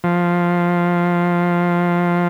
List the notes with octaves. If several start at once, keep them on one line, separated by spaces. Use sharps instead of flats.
F3